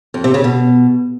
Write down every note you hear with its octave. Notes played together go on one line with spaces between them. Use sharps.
F2
C3
C#3
B2